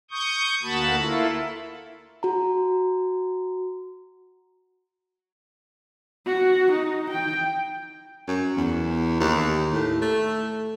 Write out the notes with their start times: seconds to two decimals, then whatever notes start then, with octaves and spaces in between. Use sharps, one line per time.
0.11 C#6 D#6 G6
0.63 D2 A#3 F#4 A5 B5
0.97 A#3 E4 F4 A4
2.23 F#4 A#5
6.26 F#4
6.72 D#4
7.10 G5
8.27 F#2
8.57 E2
9.20 D#2
9.73 A2
10.01 A3